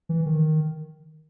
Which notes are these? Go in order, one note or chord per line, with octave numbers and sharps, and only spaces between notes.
E3
D#3